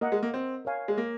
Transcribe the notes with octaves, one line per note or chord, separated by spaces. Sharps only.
A#3 A#4 D#5 F#5
G#3
A#3
C4
A#4 C#5 F5 G#5
G#3
A#3